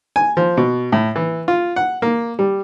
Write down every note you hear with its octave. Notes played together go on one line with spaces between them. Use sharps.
G#5
F3
B2
A2
E3
F4
F#5
A#3
G3